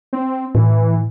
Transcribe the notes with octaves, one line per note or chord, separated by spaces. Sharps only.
C4
A2 E3